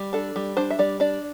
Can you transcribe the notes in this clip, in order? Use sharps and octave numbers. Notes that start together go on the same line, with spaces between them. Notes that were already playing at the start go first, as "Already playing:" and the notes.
Already playing: G3
D4 A4
G3
D4 C5
E5
G3 D5
D4 D5